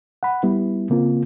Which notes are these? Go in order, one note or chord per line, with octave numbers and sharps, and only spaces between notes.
F#5 B5
G3 B3 E4
C#3 A#3 C4 F4